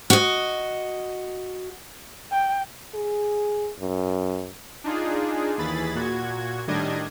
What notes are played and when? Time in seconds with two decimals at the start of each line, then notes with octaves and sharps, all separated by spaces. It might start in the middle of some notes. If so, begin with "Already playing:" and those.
0.10 F#4 D#5
2.32 G5
2.95 G#4
3.79 F#2
4.84 D4 D#4 F4 G#4
5.58 D#2 E3 G#4 B5 A6
5.95 A#2 F#4 G#6
6.67 A2 D#3 G3 D4 D#5 G#6